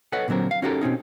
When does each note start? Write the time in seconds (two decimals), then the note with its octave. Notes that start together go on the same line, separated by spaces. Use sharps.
0.12 A4 B4 C#5 D#5 F#5
0.28 A#2 D3 F#3 C4 A#4
0.51 F5
0.62 C#4 D#4 F#4 G4 A4 A#4
0.81 B2 C4 C#4 D#4